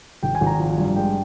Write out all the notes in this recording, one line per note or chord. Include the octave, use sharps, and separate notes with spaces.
G#1 G5
G#5
G#1
A#5
F3
G2
G#3 G5